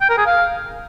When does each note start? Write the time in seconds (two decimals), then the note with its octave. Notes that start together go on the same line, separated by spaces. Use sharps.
0.01 G5
0.09 A#4
0.18 G#4
0.26 F5